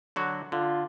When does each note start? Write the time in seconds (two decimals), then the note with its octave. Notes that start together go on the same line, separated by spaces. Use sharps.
0.16 D3 F#3 F#4
0.52 D3 F4